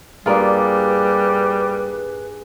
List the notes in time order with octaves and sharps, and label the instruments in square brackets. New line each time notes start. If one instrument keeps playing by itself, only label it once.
[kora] G2 A#3 F4 [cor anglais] G3 [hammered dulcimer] G#4 [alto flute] B4